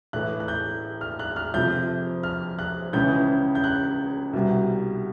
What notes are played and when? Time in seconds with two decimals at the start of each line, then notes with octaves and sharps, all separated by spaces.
0.13 A2 E3 A3 F#6
0.40 F#6
0.48 G6
1.01 F6
1.19 F#6
1.36 F6
1.54 F2 C3 F3 G6
2.23 F6
2.59 F#6
2.93 C#2 C#3 E3 G#3 G6
3.55 G6
3.64 F#6
4.33 C2 B2 G3